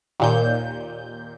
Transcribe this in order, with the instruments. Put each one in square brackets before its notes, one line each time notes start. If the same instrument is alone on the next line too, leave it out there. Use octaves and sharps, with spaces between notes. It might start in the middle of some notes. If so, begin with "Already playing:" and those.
[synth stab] D#2 A#2 G6